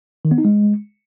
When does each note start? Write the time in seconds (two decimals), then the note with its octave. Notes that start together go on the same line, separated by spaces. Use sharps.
0.25 D#3
0.31 B3
0.38 D#4
0.45 G#3